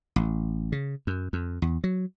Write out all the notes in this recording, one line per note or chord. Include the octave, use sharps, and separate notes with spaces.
A1
C#3
F#2
F2
E2
F#3